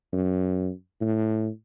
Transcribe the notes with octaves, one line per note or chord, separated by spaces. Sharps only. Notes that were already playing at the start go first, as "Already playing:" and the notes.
F#2
A2